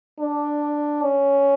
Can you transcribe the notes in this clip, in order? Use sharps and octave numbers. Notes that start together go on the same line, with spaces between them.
D4
C#4